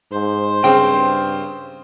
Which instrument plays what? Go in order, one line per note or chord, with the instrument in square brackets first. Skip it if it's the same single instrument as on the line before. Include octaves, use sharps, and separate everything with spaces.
[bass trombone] G#2 [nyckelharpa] C5
[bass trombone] G2 [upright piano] C#3 C4 [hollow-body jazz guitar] G5